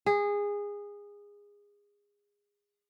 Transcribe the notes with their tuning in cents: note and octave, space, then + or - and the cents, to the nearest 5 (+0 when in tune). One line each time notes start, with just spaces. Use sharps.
G#4 -20